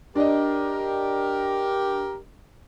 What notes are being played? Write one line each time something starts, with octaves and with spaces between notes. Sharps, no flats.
D4 G4 A#4 D5 D#5